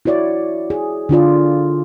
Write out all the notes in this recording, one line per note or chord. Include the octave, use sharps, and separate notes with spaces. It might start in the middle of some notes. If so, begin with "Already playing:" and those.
E4 F#4 C#5 D5
G#4
D3 D4 F4 D5